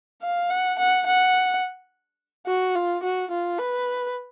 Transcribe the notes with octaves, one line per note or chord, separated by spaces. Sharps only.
F5
F#5
F#5
F#5
F#4
F4
F#4
F4
B4